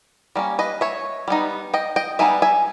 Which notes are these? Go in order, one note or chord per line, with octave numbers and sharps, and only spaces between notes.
G3 A#3 C#4
B4 D#5
C#5 E5
G3 B3 D#4
D#5 G5
D#5 G5
G3 B3 D#4 E5 G#5
E5 G#5